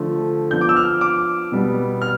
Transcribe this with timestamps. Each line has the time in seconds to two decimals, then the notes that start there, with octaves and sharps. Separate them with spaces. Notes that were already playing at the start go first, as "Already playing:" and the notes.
Already playing: D3 F3 A3
0.51 F3 B3 D4 G6
0.61 D6
0.69 E6
0.76 F6
1.01 D6
1.52 B2 G3 B3
2.02 F6